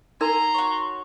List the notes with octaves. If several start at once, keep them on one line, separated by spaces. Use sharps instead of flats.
D#4 A#4 G#5 A#5 C6
F#4 C#5